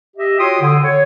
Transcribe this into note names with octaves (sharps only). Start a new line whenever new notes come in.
G4 D#5 E5
F4 F#4 C#5 G5 C6 D#6
D3
C#5